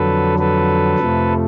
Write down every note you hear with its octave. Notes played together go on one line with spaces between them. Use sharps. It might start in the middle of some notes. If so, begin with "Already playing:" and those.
Already playing: F2 D3 F#3 A4 B4
A4 B4
F2 C3 F3 A3